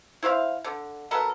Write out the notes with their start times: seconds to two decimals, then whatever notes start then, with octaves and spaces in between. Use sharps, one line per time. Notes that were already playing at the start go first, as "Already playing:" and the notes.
0.23 E4 C5 E5 F5
0.64 D3
1.11 F#3 B3 A4 A#4